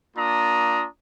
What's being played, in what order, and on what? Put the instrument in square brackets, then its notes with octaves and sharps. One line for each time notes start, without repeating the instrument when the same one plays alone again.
[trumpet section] A#3 D4 F4 A#5 D#6